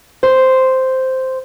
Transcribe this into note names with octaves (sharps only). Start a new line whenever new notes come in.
C5